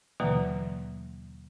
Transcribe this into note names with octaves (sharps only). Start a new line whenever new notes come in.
D#2 B2 D3 E3 F#3 A#3